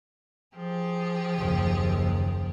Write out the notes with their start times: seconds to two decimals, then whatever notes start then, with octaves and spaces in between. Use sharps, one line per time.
0.54 F3 G4 G#4
1.38 F#1 D#2